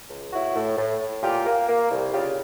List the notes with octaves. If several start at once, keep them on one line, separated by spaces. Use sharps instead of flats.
C#2
A2 E4 F#4
A2
A2
A2
A#2 F4 G4
A#3
A#3
C2
C#3 F4 G4